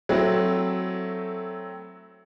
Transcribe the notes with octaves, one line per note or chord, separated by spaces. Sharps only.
F#3 A3 C4 E4